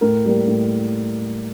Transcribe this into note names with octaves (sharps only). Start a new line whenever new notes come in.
A2 A#4
G3 A#3
A2